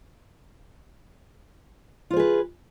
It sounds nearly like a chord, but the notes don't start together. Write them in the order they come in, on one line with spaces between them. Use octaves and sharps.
F4 C5 G#4 B4